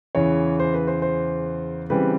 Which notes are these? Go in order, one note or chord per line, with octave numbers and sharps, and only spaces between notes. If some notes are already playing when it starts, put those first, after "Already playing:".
E2 C#3 E3 C#5
C5
B4
C5
C5
C#3 E3 G3 C4 B4